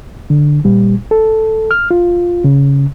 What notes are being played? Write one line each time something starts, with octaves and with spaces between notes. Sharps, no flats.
D3
A#2 G3
A4
F6
F4
C#3